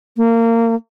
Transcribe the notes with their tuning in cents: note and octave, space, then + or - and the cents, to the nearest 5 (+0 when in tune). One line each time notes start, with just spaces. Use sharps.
A#3 -25